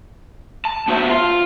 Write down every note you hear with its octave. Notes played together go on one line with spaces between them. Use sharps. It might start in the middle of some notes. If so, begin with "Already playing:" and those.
A5
B3 F#4 C5 E5
F4